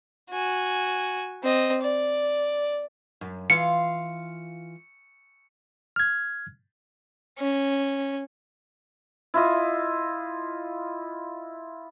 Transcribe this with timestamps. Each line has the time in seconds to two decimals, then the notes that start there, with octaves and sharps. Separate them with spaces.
0.31 F#4 G#5
1.43 C4 D#5
1.82 D5
3.21 F#2
3.50 E3 F4 F5 C#7
5.96 F6 G#6
7.39 C#4
9.34 E4 F4 D#5